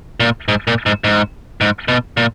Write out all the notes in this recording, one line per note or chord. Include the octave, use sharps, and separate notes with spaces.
A#2
G#2
A#2
G#2
G#2
G#2
B2
A#2